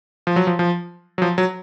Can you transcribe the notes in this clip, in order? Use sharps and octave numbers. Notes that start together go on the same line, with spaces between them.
F3
F#3
F3
F3
F#3
F3
F#3